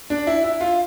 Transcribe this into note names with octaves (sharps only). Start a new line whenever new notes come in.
D4
E4
E4
F4